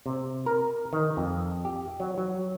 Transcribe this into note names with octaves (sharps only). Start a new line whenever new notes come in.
C3
A#4
D#3
F2
G4
F#3
F#3